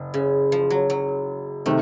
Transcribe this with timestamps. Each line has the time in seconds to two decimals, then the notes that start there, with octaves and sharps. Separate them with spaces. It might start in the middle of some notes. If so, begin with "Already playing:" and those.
Already playing: F#1
0.14 C#3
0.52 F3
0.70 F#3
0.90 F#3
1.66 C3 D#3 A3